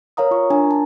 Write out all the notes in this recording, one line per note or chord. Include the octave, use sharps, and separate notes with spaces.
A#4 C#5 F5 A#5 D#6
F4 C#6
D4 A#4 G#5 A#5
A5